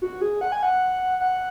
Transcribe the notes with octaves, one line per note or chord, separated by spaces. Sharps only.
F#4
G#4
F#5
G#5
F#5
F#5